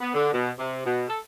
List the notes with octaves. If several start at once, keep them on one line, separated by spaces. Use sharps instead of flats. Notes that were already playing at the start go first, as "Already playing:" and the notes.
B3
D3
B2
C3
B2
A4